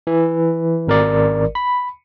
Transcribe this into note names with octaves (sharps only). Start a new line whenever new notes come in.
E3
G#1 A#4 D5
B5